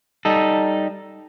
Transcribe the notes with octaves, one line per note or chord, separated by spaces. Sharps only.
G3 D#4 A4